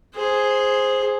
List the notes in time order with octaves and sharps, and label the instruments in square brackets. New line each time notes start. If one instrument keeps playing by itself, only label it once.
[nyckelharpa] G#4 C5